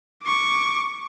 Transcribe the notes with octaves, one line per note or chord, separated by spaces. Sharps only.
C#6 D6